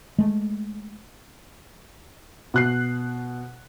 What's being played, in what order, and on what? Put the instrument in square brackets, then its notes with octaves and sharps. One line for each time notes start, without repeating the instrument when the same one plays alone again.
[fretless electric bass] G#3 A3
[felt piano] B2 F#6 C7